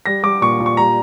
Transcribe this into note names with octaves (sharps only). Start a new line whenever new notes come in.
G3 A#6
G3 D6
A#2 C#6
A#2
C#6
G3 A#5